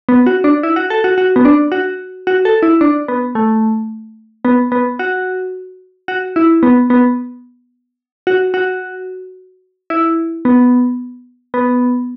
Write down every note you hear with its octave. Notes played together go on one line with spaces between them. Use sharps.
B3
F#4
D4
E4
F#4
A4
F#4
F#4
B3
D4
F#4
F#4
A4
E4
D4
B3
A3
B3
B3
F#4
F#4
E4
B3
B3
F#4
F#4
E4
B3
B3